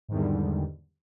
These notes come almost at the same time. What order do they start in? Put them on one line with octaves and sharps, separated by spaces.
G#2 D#3 E2 G3 D3